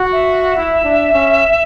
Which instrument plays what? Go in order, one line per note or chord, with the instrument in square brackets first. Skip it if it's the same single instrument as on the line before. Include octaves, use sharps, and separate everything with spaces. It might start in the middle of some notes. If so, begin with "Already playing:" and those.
Already playing: [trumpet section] F#4
[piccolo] E5
[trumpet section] E4
D4
C#4